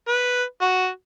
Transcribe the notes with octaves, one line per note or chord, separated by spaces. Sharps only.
B4
F#4